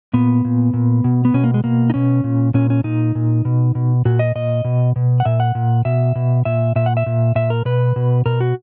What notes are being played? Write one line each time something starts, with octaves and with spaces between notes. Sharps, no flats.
A#2 B3
A#2
A#2
B2
B3
B2 C#4
A#3
G#3
B2 A#3
D#4
B2 C#4
A#2
A#2 C#4
C#4
A#2 D#4
A#2
B2
B2
A#2 F#4
D#5
A#2 D#5
B2
B2
F#5
A#2 E5
F#5
A#2
B2 E5
B2
A#2 E5
A#2 E5
F#5
E5
A#2
A#2 E5
A#4
B2 B4
B2
B2 A#4
F#4